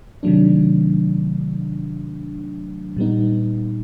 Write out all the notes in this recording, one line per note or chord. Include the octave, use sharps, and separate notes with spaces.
C3 D#3 F#3 A3 D4
A#2 G3 B3 D#4